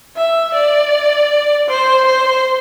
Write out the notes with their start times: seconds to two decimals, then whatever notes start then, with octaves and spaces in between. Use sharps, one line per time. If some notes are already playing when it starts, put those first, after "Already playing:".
0.16 E5
0.54 D5
1.68 C5
2.06 C5